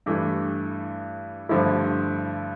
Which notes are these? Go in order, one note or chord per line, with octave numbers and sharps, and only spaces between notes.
G2 E3 A3
G2 D3 F3 A3 E4